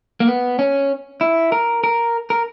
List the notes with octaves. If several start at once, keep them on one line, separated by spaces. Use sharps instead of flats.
A#3
B3
C#4
E4
A#4
A#4
A#4